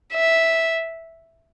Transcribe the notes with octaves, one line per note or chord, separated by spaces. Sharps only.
E5